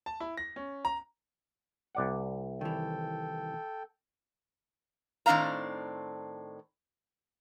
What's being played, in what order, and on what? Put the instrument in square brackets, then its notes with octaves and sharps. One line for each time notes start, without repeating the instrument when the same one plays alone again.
[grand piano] A5
E4
A#6
C#4
A#5
[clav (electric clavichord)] C2 D5 F#5
[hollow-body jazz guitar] D#3 E3 [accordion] A4 G5
[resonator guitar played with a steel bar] A2 D#3 C4 D4 F5 A#5